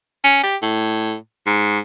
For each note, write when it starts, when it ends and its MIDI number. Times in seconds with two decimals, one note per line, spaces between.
0.24 0.39 61
0.43 0.56 67
0.62 1.15 45
1.47 1.79 44